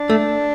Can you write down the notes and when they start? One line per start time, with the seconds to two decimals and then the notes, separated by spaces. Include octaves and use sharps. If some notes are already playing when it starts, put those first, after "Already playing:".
Already playing: D4
0.10 A3